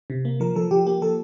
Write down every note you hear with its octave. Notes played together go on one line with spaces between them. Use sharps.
C3
A#3
F3 A#4
F3 A4
F3 G4
A#3 G4
F3 A4